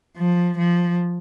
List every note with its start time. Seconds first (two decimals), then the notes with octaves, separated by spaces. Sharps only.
0.17 F3
0.57 F3